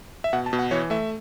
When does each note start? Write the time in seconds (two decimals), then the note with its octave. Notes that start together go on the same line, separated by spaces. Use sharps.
0.24 E5
0.33 B2 F#5
0.46 A5
0.53 B2
0.59 F#5
0.71 E3 C#5
0.90 A3 E5